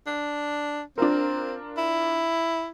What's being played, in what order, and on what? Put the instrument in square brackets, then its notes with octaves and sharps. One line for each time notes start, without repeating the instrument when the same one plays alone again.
[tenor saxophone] D4
[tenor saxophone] C4 [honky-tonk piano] D4 F4 A#4
[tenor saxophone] E4